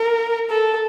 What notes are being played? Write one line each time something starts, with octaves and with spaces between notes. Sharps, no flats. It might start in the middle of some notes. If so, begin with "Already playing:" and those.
Already playing: A#4
A4